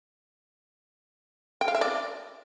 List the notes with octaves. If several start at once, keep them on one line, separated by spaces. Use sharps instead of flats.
G5
F5
E5
D5